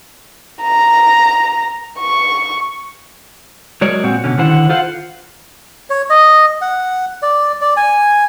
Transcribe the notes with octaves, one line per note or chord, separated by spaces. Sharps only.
A#5
C#6
F#3 G#3 A#4 C#5 D5
A#2 C4 F#4
B2 D3 C#4
D3 D#3 E4 C5 F#5
F4 A4 C5 F5 F#5
C#5
D#5
F#5
D5
D5
G#5